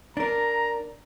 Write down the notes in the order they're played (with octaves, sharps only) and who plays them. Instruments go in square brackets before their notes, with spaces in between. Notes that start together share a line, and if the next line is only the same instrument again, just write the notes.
[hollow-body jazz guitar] D4 A#4 [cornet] A#5